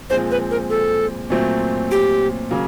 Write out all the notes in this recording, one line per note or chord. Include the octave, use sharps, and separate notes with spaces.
A#2 F3 G#3 C4 C5
B4
A#4
A4
A#2 F#3 A3 C4
G4
C#3 F#3 A#3